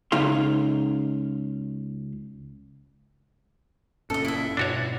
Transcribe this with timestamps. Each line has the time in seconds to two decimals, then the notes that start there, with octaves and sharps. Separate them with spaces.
0.12 C#2 D#4 E5 F5 C6
4.10 F#1 A#2 C#4 A4 D#5
4.25 E4 E5
4.57 G2 B2 D4 F#4 C#5